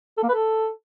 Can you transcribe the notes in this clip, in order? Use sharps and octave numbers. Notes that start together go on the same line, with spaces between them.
A4
A#3
B4
A4